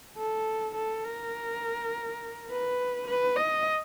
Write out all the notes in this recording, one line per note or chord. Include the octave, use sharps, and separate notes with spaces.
A4
A4
A#4
B4
B4
D#5